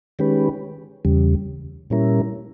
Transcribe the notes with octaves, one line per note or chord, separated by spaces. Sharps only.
D#3 G#3 C#4 G4 B4
E2 C#3 G3
A#2 G3 C#4 E4 A#4